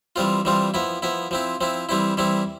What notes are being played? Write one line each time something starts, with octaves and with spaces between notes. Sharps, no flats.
E3 G3 C4 F4
E3 G3 C4 F4
F3 B3 E4
F3 B3 E4
F3 C4 E4
F3 C4 E4
E3 G3 C4 E4
E3 G3 C4 E4